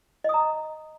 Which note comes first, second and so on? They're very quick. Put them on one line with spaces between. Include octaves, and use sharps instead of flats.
D#5 D#6 A#5